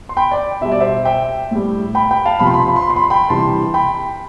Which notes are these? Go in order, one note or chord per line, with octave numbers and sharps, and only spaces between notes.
C6
G5 B5
D5
B2 G3 E5
D5
C5 E5
E5 G5
A2 G3
G5 B5
G5 B5
F5 A5
C3 F3 B5
C6
B5
C6
B5
C6
B5
C6
B5
C6
G5 B5
C3 E3 G3 A5 C6
G5 B5